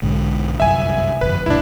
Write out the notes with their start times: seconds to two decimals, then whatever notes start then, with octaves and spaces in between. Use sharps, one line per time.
0.02 B1 G#2 D3
0.60 G1 C2 F#2 E5 G#5
1.21 G1 F2 B4
1.46 F1 C#2 A#2 D4 E4